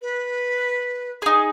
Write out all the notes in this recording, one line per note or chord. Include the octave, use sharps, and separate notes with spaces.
B4
D#4 G#4